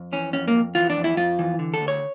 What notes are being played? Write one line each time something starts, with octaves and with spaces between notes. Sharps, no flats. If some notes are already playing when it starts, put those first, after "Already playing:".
Already playing: F2
E3 C#4
F2 C#4
A#3
F2
E3 F4
D4
F2
E4
F2 F4
E3
D3
A4
D2
C#5